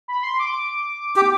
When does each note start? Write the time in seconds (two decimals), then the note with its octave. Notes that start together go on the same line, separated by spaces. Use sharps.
0.08 B5
0.23 C6
0.40 D6
1.16 G4